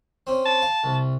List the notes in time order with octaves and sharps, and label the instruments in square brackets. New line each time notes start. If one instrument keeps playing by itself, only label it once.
[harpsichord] C4 C#4
[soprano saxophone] A5
[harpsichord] F5
C2